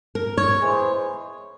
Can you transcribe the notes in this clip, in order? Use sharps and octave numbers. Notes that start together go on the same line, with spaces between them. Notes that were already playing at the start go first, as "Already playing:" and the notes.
A#4
C#5
E3 G#3 E4 G#4 C5